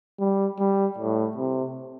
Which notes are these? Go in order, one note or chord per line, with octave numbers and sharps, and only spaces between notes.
G3
G3
A2
C3